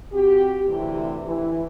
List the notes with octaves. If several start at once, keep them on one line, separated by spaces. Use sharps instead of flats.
C4 F#4 G4
D2 C3 E3
E3